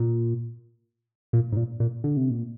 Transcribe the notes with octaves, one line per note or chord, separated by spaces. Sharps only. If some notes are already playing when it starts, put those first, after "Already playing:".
Already playing: A#2
A#2
G#2
A#2
A#2
D3
C3
A#2